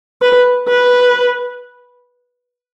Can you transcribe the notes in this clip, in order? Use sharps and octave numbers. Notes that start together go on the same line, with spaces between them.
B4
B4